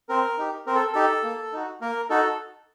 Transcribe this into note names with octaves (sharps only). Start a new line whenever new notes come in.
C4 A#4
D#4 G4
C4 A#4
A4
D#4 G4 A4
A#3
D#4 F#4
A#3 A#4
D#4 F#4 A4